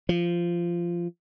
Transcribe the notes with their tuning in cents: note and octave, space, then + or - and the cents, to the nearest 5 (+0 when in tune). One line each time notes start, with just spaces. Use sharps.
F3 -15